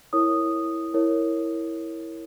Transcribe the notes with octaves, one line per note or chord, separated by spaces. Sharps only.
E4 A#4 C#5 D#6
E4 A#4 C#5